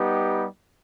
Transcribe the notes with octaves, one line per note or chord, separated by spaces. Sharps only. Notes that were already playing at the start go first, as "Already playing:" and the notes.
Already playing: G3 B3 D#4 G4